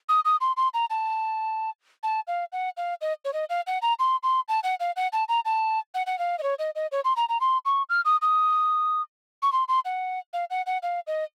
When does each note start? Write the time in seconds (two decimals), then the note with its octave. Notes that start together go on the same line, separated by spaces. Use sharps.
0.09 D#6
0.25 D#6
0.41 C6
0.57 C6
0.74 A#5
0.90 A5
2.03 A5
2.28 F5
2.53 F#5
2.77 F5
3.01 D#5
3.25 C#5
3.33 D#5
3.50 F5
3.67 F#5
3.82 A#5
3.99 C6
4.23 C6
4.48 A5
4.64 F#5
4.80 F5
4.96 F#5
5.13 A5
5.29 A#5
5.45 A5
5.95 F#5
6.07 F#5
6.19 F5
6.39 D#5
6.43 C#5
6.59 D#5
6.75 D#5
6.92 C#5
7.05 C6
7.17 A#5
7.29 A#5
7.41 C6
7.65 C#6
7.89 F6
8.05 D#6
8.22 D#6
9.43 C#6
9.52 C6
9.68 C6
9.85 F#5
10.33 F5
10.50 F#5
10.67 F#5
10.83 F5
11.07 D#5